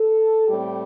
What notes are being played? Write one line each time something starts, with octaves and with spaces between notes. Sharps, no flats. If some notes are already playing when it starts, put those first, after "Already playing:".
Already playing: A4
A2 G3 C4 G4